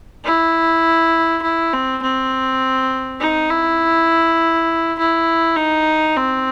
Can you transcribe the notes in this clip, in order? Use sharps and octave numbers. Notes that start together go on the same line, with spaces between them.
E4
E4
C4
C4
D#4
E4
E4
D#4
C4